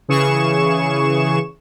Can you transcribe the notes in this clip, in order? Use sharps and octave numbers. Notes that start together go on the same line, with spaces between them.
C#3 E3 G#4 C#6 E7